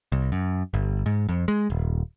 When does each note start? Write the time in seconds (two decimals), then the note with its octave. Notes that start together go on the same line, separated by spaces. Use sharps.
0.12 C2
0.32 F#2
0.74 G1
1.06 G#2
1.29 F2
1.48 G#3
1.70 D#1